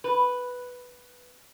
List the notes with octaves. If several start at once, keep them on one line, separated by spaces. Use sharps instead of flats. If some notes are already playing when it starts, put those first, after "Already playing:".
B4